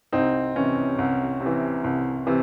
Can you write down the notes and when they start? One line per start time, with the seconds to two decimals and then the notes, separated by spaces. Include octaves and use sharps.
0.13 C2 C4 D#4
0.56 C3 E3 C#4
0.99 C2
1.40 C3
1.46 E3
1.84 C2
2.27 C3 E3